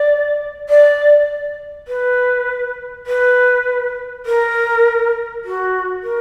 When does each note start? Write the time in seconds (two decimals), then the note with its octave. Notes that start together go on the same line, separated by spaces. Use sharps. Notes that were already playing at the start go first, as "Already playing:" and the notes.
Already playing: D5
0.69 D5
1.88 B4
3.06 B4
4.26 A#4
5.44 F#4
6.04 A#4